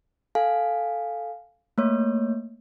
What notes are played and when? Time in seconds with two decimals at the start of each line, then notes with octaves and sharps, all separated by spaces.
0.35 A4 F5 G#5
1.78 A3 A#3 C#5